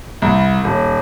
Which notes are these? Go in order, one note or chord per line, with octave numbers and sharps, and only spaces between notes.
C2
D#1